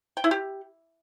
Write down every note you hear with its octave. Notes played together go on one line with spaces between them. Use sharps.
G5
E4
G4